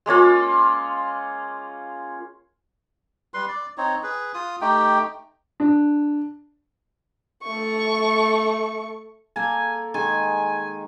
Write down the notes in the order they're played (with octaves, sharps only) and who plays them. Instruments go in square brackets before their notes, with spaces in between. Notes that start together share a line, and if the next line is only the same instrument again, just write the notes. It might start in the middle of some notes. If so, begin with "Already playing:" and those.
[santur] G#3 A#3 C#4 F4
[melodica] G3 B4 C6
D5
C4 D#4 C#5
G#4 B4
F4 D#6
A3 D#4 G4 G5
[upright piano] D4
[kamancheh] A3 C#6
[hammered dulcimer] A#3 A4 [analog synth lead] G#5
[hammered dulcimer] D#3 G#3 [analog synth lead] G#5